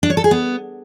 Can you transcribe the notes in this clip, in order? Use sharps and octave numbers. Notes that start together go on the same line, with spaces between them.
D4
C#5
A4
G#4
B3